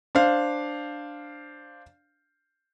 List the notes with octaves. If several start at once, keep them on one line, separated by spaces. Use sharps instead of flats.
D4 C5 F5